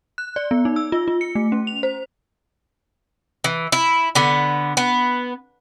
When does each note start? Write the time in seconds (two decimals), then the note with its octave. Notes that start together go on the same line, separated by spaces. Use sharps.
0.18 F#6
0.36 D5
0.51 B3
0.65 D#4
0.76 E6
0.92 F4
1.08 F4
1.21 C#7
1.35 A3
1.52 C#4
1.67 F7
1.83 C5
3.44 E3
3.72 E4
4.15 D3 B3
4.77 B3